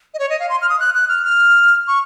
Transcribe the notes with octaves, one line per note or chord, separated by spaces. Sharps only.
D#5
C#5
D#5
F5
C6
F6
D#6
F#6
F#6
F6
F6
C#6